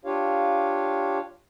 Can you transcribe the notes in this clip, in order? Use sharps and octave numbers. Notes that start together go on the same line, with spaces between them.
D4 F4 G4 C#5 F5